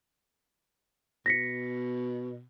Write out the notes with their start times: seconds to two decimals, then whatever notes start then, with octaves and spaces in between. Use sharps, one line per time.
1.26 B2 A#6 B6 C#7